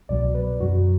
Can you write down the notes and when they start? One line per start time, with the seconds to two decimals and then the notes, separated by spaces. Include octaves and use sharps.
0.09 C2 B2 F#3 D5
0.35 B4
0.60 F#2 F#3 F#4